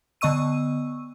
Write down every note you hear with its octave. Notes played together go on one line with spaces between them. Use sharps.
D3 B3 D#5 C#6 E6 D#7